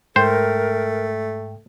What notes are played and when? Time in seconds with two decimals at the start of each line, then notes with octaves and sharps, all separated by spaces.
0.16 G#2 A3 A#4 C5 G5